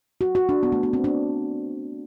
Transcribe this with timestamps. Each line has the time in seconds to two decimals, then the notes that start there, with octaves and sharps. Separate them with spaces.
0.21 F#4
0.35 F#4
0.49 D4
0.63 B3
0.72 A3
0.83 B3
0.93 C4
1.04 D4